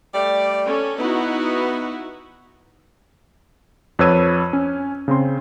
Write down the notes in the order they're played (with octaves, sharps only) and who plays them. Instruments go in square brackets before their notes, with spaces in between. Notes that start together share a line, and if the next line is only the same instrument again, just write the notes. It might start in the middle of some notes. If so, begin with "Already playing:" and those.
[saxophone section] G3 A3 D5
[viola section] C#4 A4
[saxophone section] B3 [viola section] D#4 E4 F#4
[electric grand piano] F2 B4 C#5 E6 G#6 D#7
C#4
C#3 C4 C6